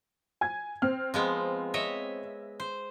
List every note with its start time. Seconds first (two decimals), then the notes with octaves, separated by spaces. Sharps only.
0.41 G#5 G#6
0.82 C4 F6
1.14 F3 G#3 B3
1.74 C#5 D#5 E5
2.60 C5